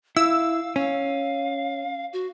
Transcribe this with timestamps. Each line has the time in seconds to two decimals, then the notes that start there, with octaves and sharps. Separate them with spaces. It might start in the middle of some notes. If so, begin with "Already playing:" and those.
0.17 E4 F5 E6
0.76 C#4 F5
2.13 F#4